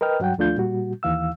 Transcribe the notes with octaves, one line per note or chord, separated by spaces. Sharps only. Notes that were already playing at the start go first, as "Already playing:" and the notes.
A#4 B4 D#5 G5 F6
G2 F#3 F#5 G5
D#2 F3 A3 D4 F4 G6
A#2 G3 F#4
D#2 E3 F5 E6